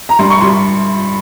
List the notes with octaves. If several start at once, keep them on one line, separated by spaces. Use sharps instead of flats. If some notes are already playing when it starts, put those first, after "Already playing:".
A#5
G2 C6
C#6
G3 C6